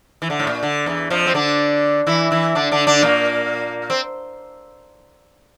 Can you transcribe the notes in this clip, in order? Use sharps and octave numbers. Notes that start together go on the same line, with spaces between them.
E3
D3
A2
A#2
D3
E2 E3
F2 F3
C4
D3 D4
E3 E4
E3 E4
D3 D4
D3 D4
D3 D4
A#2 A#3
C4